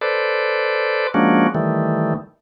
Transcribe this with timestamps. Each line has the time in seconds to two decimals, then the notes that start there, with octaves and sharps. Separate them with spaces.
0.01 A4 B4 C5 D5
1.14 F3 G#3 A#3 C#4 D4 F#4
1.55 D#3 E3 G3 A3